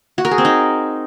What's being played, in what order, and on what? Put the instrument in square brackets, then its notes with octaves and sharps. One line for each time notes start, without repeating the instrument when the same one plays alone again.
[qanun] F#4
A#4
G#4
C4
D#4